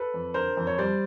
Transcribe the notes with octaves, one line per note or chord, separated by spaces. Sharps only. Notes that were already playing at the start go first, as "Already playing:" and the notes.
Already playing: A4 B4
F2
D3 A#4 C5
F2
C#5
G3 C5 D5